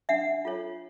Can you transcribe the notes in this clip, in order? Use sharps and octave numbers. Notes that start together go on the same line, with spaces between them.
D4 E5 F#5
F4 A4 C#5